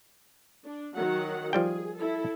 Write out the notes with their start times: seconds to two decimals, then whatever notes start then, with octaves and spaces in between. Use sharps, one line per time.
0.65 D4
0.95 D#3 F#3 F#5
1.53 F3 G3 G#4 G5
1.97 E4 A4